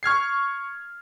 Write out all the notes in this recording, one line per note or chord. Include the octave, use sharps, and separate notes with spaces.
C#6 F6 G#6 C7